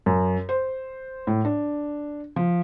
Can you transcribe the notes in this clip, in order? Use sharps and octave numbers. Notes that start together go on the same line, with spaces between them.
F#2
C5
A2
D4
F3